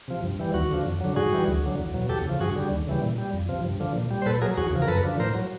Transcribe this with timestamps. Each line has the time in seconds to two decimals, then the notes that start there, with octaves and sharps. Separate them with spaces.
0.08 C3 F3
0.23 G2
0.39 E3 G3
0.54 D#2 F#4
0.70 D3 F3
0.86 F2
1.01 D3 F#3
1.16 G#2 F#4 G#4
1.32 E3 G3
1.47 D2
1.63 D3 F#3
1.78 E2
1.94 B2 F#3
2.09 E2 G4 A4
2.25 C#3 F3
2.40 G2 F#4 G#4
2.56 D3 G3
2.71 D#2
2.87 C#3 E3 G3
3.02 A#2
3.18 G3
3.33 F2
3.49 C3 F3
3.65 G2
3.80 D3 F3
3.95 A#2
4.11 G3
4.22 C5
4.26 A#2 A4 B4
4.42 F#3 G#4 A#4
4.57 E2 F#4 G#4
4.72 C#3 F3
4.82 A#4
4.88 F#2 A4 B4
5.04 D3 F3
5.19 A2 A#4 C5
5.35 F#3